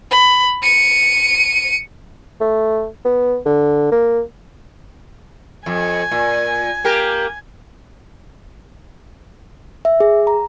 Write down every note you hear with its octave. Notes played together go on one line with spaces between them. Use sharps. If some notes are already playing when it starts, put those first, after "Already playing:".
B5
C#7 D#7
A3
B3
D3
A#3
F2 G#5
A#2
A#3 G4 A#4
E5
G#4
A#5